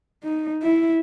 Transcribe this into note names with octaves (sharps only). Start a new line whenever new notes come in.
D#4
E4